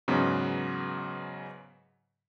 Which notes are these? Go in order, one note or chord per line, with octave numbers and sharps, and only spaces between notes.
E2 G#2 C#3 F#3 B3